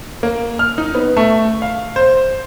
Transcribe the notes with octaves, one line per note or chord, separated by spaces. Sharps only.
A#3
F6
D#4
B3
A3
F5
C5